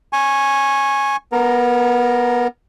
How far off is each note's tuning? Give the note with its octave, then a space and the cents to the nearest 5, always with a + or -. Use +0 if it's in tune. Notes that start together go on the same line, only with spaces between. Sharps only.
G#5 +0 C#6 -20
B3 -20 A#4 +0 A#5 +0